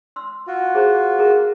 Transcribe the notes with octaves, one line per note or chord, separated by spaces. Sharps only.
C6 E6
F4 F#4
G#4 C5 A#5
G#4 A#4 A#5